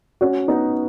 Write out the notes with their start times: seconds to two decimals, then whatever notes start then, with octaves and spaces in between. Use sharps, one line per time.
0.21 C#4 F#4
0.48 B3 D#4